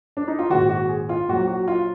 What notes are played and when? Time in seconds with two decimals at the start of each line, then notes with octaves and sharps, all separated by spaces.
0.17 D4
0.28 D#4
0.39 F4
0.50 A#1 G#2 D#3 F#4
0.69 F#4
0.89 G#4
1.09 F4
1.28 A#1 A#2 F#3 F#4
1.48 F#4
1.68 F4